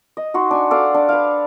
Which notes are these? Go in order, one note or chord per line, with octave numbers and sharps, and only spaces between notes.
D#5
D#4 F#4 C6
D4 G#5
A4 D5 F5 F#5
D4
B4 F5